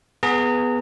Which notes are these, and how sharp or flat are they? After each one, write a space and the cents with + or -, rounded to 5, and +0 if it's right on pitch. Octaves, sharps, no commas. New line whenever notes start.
B3 +0 G#4 +10 A#5 -30